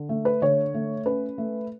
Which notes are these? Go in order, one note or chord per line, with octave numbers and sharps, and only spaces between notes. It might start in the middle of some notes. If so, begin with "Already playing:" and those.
Already playing: D3
A3
B4
D3 C#5
A3
C#4 B4
A3